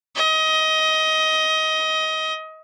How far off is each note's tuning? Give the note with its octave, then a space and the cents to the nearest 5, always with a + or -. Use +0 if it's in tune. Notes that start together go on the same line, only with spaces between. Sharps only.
D#5 +20